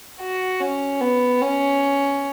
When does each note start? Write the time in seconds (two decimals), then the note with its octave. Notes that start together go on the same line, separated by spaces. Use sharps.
0.21 F#4
0.61 C#4
1.01 B3
1.42 C#4